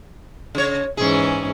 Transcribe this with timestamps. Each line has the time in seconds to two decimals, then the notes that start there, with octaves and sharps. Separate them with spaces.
0.55 C#3 C#5
0.97 G#2 E3 C#4 G#4